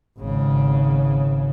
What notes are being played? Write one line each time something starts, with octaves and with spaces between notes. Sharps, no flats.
G#1 C#3